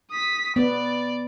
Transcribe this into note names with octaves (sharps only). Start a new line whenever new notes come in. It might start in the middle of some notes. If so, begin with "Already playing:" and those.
D#6 B6
B3 D5